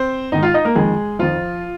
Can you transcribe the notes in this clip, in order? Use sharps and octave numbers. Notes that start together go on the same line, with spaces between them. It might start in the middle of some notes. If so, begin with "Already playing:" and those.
Already playing: C4 C5
G#2 D#3 D#4 D#5
F4 F5
D#4 D#5
A#3 A#4
F2 D#3 G#3 G#4
F2 D#3 F3 F4